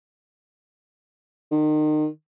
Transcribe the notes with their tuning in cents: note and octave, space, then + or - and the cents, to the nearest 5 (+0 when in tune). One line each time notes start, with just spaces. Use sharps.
D#3 -30